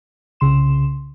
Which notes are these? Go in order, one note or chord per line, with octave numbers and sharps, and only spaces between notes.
C2 C#3 C6 E7